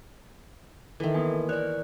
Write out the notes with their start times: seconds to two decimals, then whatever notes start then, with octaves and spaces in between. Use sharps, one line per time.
1.00 D#3 E3 A4 E5
1.14 A#3 B3 G#5
1.49 A#4 C#5 D5 F#6